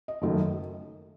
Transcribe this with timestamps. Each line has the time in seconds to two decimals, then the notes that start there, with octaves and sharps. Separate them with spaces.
0.08 D#5
0.22 F#1 F#2 D#3 A3